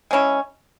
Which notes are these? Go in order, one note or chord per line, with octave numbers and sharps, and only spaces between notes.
G#3 C#4 E4